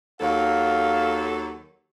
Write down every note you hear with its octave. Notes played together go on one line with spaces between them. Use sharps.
D#2 F#3 A4 F5